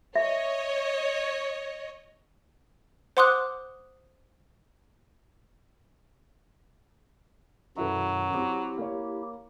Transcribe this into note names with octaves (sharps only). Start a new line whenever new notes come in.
C#5 D#5 E5
C5 F#5 C6 D6 D#6 F#6
F#2 B2 D#3 F#3 E4 A4 B4
C4 E4 G4
A#3 C#5